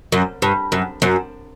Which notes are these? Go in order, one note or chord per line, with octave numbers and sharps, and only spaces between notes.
F#2
G2
F#2
F#2